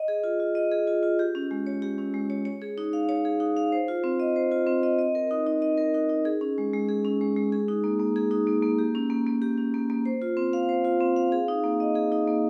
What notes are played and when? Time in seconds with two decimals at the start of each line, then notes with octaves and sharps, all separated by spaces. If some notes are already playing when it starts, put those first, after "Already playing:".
Already playing: D#5
0.08 G#4
0.24 F4
0.40 F4
0.55 D#5
0.72 G#4
0.87 F4
1.03 F4
1.19 G4
1.35 C#4
1.51 G#3
1.66 C#5
1.82 G4
1.98 C#4
2.14 G#3
2.30 C#5
2.45 C#5
2.62 G#4
2.78 D#4
2.93 F5
3.09 C#5
3.25 G#4
3.40 D#4
3.57 F5
3.72 C5
3.88 F4
4.04 C4
4.20 D#5
4.36 C5
4.51 F4
4.67 C4
4.83 D#5
4.99 D#5
5.15 A#4
5.31 D#4
5.47 D#4
5.62 D#5
5.77 A#4
5.94 D#4
6.09 D#4
6.25 G#4
6.41 C#4
6.58 G#3
6.73 G#3
6.88 G#4
7.05 C#4
7.21 G#3
7.36 G#3
7.52 G#4
7.68 D#4
7.84 A#3
8.00 A#3
8.16 G#4
8.31 D#4
8.47 A#3
8.62 A#3
8.79 G4
8.95 C#4
9.10 A#3
9.27 A#3
9.42 G4
9.57 C#4
9.74 A#3
9.90 A#3
10.06 C5
10.22 F4
10.37 C4
10.53 F5
10.69 C5
10.84 F4
11.00 C4
11.16 F5
11.32 G#4
11.48 D#4
11.64 A#3
11.80 D#5
11.95 G#4
12.12 D#4
12.28 A#3